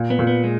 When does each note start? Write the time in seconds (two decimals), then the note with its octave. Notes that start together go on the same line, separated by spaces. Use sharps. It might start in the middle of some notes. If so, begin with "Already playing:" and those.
Already playing: A#2
0.10 B3
0.19 A#2
0.27 B3
0.44 G#3